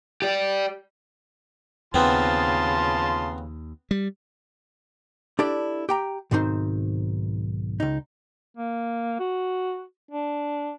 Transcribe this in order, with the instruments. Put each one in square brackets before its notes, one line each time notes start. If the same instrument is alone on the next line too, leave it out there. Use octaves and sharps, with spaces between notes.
[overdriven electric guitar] G4 D5
[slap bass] D#2 [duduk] C#3 [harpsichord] B3 C4 [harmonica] F4 A5 C6
[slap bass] G3
[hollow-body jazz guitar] D4 E4 G4 A4 D5
G4 G5 A#5
B1 G#2 D#3 C4 D#4 C5
C#2 D#4
[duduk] A#3
F#4
D4